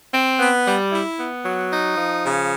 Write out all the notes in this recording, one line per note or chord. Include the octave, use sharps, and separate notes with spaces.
C4
B3
G3
E4
B3
F#3
D#4
F3
C#3